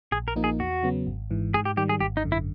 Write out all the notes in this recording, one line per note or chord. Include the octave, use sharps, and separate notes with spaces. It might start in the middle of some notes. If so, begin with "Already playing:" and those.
A#1 G#4
A#4
A#2 F3 A#3 D#4
G#4
E2 F#4
C#3 F#3 B3
G#1
G#2 E3
G#2 G#4
G4
D#3 G3 G4
G#4
G#1 G4
D#4
F#2 D3
E4